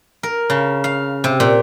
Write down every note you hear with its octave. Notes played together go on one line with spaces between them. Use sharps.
A#4
C#3
F5
C3
A#2